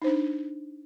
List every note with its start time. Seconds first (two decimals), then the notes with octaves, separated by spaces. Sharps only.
0.02 D#4
0.04 C5
0.07 D4